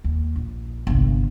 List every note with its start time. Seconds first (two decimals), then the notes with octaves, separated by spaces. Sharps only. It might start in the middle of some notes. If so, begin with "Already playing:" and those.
0.04 D#2
0.36 A#1
0.87 G1 C2